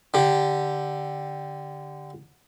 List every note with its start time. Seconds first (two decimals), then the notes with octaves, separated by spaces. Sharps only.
0.14 D3 G4